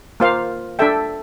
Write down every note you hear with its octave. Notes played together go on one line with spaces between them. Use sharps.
A#3 F4 C5 F5
D4 A4 E5 G5